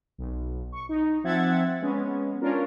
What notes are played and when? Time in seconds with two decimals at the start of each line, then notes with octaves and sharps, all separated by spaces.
0.18 B1
0.72 C#6
0.89 D#4
1.24 F3 C4 E5 F#5 G#6 A6
1.81 G#3 B3 C#4
2.41 C#4 D4 F4 A#4